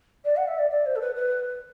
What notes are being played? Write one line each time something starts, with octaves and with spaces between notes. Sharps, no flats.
D5
F#5
E5
D5
D5
C5
A4
B4
B4